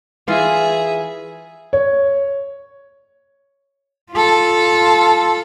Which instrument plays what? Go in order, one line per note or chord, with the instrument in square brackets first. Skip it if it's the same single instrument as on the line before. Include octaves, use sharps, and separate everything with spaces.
[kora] E3 F4 [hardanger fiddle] G#4 E5
[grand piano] C#5
[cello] F4 A4